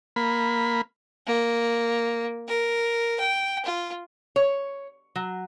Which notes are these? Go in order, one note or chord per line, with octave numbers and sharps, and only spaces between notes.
A#3 B5
A#3
A#4
G5
F4
C#5
F#3